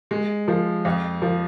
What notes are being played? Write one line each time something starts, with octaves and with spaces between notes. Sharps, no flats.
G#3
F3
F2
F3